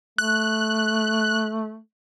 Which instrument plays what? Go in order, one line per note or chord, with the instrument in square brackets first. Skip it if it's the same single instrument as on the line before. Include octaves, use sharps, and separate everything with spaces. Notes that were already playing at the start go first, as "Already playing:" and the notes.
[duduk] A3 [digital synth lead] F#6